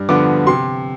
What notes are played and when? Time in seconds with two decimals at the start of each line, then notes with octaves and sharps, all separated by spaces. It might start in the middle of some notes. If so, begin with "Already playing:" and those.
Already playing: G2
0.09 D3 F3 B3 D6
0.47 C3 C6